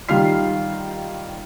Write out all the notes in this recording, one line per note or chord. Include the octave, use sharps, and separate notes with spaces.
D#3 G3 F4 F6 C7